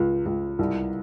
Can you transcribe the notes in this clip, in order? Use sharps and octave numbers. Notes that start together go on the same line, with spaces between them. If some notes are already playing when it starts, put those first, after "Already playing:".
Already playing: C#2
C#2
C2